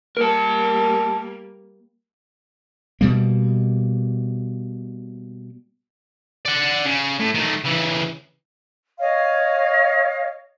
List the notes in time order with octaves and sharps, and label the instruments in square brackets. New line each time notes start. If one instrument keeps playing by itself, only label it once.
[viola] G3 A#3 [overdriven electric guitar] A#4 A5
[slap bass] B2 G3 A#3
[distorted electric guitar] D5 F#5
C#3
A2
D#3 A3
C#3 E3
[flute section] C#5 D#5 F5